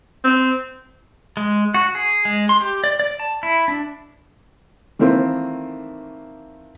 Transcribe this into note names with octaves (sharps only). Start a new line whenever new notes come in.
C4
G#3
F#4
G#4
G#3
C6
G4
D5
D5
A5
E4
D4
D#3 E3 A3 A#3 C4 E4